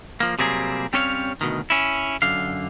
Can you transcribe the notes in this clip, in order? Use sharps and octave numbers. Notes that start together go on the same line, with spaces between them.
F3 A#3
C3 F#3 G3 A#3 C4 G#4
G3 C4 C#4 C#5 D#5 F5
D2 B2 D#3
C#4 E4
F#2 D3 F5